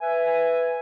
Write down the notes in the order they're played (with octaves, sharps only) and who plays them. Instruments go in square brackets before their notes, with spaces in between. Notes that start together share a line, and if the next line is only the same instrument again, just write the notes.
[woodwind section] B4 E5 G#5